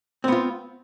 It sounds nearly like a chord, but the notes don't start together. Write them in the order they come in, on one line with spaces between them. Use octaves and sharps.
C4 B3 F4